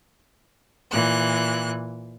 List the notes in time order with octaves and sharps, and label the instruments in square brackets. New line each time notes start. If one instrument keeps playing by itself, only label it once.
[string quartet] A#2 E3 F#6